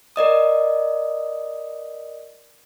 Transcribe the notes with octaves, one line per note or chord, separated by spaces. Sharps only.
A#4 D5 D#5 D#6